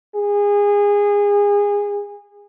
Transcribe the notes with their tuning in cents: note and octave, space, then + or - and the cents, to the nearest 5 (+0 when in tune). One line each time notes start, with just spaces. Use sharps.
G#4 -25